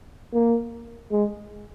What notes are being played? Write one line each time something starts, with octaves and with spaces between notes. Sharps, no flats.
A#3
G#3